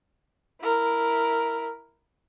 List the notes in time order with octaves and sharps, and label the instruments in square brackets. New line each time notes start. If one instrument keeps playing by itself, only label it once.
[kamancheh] E4 A#4